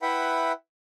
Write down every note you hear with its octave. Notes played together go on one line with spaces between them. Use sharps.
E4 B4 E5 F#5 G5 B5